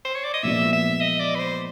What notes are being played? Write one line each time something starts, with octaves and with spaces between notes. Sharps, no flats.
C5
C#5
D5
D#5
A#2 F3 G#3 B3 E5
E5
D#5
D5
B4
C5